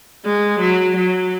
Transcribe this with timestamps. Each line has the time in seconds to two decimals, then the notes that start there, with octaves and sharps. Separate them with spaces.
0.25 G#3
0.60 F#3
0.96 F#3